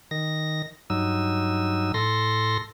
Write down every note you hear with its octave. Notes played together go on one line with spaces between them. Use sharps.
D#3 A#6
G2 F#3 D#4 E6
A2 A4 C6 A#6